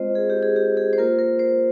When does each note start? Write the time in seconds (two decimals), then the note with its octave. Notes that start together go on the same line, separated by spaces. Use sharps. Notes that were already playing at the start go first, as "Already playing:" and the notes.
Already playing: G#3 C4 F4 C5 D#5
0.15 G#4
0.30 G4
0.43 G#4
0.56 G4
0.77 G#4
0.93 C5
0.98 A#3 F4 A#4
1.19 A#4
1.39 C5